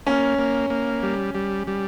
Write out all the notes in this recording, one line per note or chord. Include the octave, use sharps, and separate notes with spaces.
A#3 C#4
A#3
A#3
G3
G3
G3